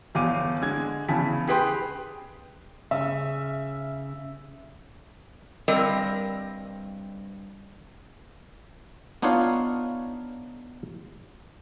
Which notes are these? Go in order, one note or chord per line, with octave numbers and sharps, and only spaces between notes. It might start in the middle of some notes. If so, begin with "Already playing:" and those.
G1 E2 F5 D6 D#7
D3 G#3 G#6
E2 C#3 E4 A5 B6
G4 G#4 B4 G5 C6
C#3 E5
G2 G3 C4 A#4 D#5
B3 D4 D#4 F4 C#5 F5